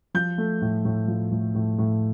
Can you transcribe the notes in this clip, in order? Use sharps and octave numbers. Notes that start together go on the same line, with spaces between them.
F3 G6
A3
A2
A2
F3
A2
A2
A2